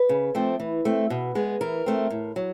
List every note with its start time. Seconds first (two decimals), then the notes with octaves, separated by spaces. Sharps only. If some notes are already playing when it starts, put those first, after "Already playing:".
Already playing: B4
0.09 C#3
0.35 F3 A3 C4
0.60 E3
0.85 A3 C4
1.10 B2
1.35 G#3 B3
1.61 E3 A#4
1.86 A3 C4
2.10 A2
2.36 F#3